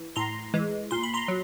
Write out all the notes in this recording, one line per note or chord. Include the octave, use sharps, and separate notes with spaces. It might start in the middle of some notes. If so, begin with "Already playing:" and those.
Already playing: E3
A2 A#5 C6
E3 G#3
A#2 C6
B5
A#5 C6
F#3